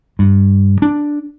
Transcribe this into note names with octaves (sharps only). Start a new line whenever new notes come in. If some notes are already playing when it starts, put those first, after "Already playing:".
G2
D4